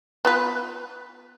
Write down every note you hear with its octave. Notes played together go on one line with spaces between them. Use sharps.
B3 F4 B4